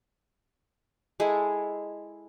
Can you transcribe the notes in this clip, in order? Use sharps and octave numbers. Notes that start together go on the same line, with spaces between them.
G#3 E4 G#4 A4